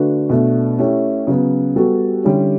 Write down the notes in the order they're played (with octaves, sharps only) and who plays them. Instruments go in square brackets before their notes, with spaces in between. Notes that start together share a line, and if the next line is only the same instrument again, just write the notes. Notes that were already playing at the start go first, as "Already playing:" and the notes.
Already playing: [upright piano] D3 A3 D4 F#4 B4
B2 A3 D4
A3 C#4 E4 G4
C#3 F#3 B3
G3 B3 F#4 A4
D3 G3 C#4 E4